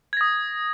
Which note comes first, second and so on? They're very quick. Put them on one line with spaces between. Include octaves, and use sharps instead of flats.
G#6 A#6 D#6